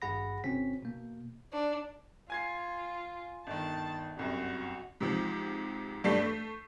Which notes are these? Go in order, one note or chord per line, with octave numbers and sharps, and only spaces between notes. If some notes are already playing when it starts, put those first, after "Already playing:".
G#1 G2 G#4 F#5 B5 A#6
G1 C3 C4 C#4 B6
B2 A#3
D4
F4 G#5 G#6 C7
G1 D#3 A5
G1 C2 F#2 F#4
G#2 C3 F3
G2 A3 D4 G4 B6 C7
A3